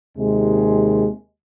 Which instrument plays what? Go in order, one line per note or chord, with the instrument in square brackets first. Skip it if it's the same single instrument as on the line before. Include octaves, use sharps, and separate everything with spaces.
[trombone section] D#2 C3 G#3